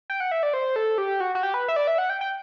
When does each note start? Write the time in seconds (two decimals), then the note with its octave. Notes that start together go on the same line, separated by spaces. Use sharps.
0.10 G5
0.20 F#5
0.31 E5
0.43 D5
0.54 C5
0.76 A4
0.98 G4
1.20 F#4
1.35 F#4
1.43 G4
1.54 B4
1.68 E5
1.76 D5
1.87 E5
1.98 F#5
2.10 G5
2.21 G5